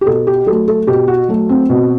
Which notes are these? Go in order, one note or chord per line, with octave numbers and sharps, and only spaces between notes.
G4
B2 A4
G4
F#3 A3 A4
A4
B2 G4
F#4
F#3 A3
C4
B2